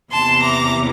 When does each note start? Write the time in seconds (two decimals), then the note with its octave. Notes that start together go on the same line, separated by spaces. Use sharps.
0.13 E2 C3 E3 A#3 A5 C6
0.42 A#5 D6